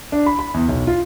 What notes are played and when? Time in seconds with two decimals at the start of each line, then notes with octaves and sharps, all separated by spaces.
0.12 D4
0.26 B5
0.39 B5
0.54 E2
0.69 B1
0.87 F4